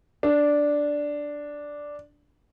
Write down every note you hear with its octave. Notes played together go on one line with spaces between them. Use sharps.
D4